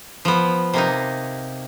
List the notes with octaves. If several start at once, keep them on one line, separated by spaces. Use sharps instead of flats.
F3 B3
C3 A#3 D#4